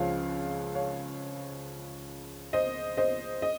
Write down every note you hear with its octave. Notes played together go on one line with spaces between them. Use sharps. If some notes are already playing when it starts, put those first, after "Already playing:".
Already playing: C#2 C#3 F3 C#5 F5
C#5 F5
C5 D#5
C5 D#5
D#5